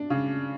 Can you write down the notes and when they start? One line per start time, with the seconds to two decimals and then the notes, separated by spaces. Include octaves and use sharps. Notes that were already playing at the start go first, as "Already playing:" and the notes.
Already playing: D4
0.10 C#3